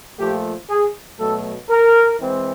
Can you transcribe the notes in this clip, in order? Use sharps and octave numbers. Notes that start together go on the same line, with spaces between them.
A#2 F3 A3 G4
G#4
B2 F#3 A3 A4
A#4
E3 G#3 C4